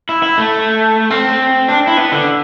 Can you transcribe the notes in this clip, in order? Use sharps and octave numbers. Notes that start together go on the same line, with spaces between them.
E4
E4
A3
C4
D4
E4
B3
D3